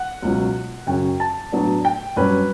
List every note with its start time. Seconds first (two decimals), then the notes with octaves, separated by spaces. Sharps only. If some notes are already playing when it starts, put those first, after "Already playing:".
Already playing: F#5
0.22 C#2 B2 F#3 C#4
0.87 F#2 C#3 F#3 C#4 G5
1.20 A5
1.52 A2 F#3 B3 D4
1.85 G5
2.16 G2 F#3 C#4 B4